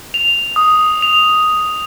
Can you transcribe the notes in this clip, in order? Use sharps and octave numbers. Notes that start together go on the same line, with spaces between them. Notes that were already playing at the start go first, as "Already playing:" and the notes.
F7
D#6
F7